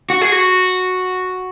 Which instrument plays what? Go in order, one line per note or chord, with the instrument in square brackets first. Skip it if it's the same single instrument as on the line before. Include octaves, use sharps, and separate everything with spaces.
[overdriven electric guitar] F#4
G#4
F#4